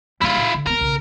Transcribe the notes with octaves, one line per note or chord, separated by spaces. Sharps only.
G3 A#3 E4 F4
A#2
D3
G2 B3 A#4
B1 C#3